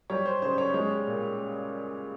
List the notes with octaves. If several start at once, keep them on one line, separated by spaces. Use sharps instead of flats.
G3 C#5
C5
C#3 C5
C#5
G#3 C#5
A#2